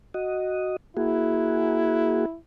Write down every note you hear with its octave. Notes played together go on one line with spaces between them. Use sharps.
F#4 D#5
A#3 E4 F#4 G#4